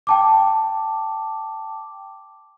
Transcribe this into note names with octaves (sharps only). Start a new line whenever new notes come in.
G5 A5 D6